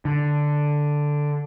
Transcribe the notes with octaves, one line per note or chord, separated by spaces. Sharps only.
D3